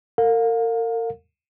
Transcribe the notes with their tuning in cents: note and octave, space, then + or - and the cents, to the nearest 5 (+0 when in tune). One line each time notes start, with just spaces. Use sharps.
A#4 -40 F5 +30